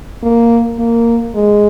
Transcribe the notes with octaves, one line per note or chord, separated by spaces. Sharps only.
A#3
A#3
G#3